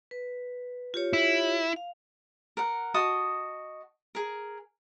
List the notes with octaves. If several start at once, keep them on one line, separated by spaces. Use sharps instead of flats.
B4
F4 G4 C#5
E4
F5
A#4 F#5
F#4 D#5 A5 D#6
G#4 A#4